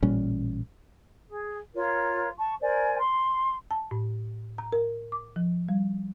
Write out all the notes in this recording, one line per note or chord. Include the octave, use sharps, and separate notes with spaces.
A1 A#2 G3 C#4
G#4
F4 A#4 C#5
A5 C#6
A#4 C5 D5 G#5
C6
A5
A2
A#5
A#4
D6
F3
G3